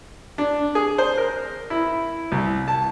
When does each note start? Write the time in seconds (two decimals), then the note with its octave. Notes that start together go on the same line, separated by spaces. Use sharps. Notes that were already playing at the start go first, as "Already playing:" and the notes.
0.38 D4
0.75 G#4
0.98 C5
1.18 A#4
1.70 E4
2.32 C2
2.68 A5